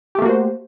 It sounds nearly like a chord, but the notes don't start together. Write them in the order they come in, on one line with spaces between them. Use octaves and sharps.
G4 A3 A#3 F#4 C5